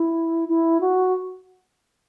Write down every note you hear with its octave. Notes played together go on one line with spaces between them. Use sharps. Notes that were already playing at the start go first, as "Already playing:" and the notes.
Already playing: E4
E4
F#4